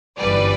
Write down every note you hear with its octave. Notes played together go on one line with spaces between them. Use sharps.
G1 F#2 E3 G3 B4 D5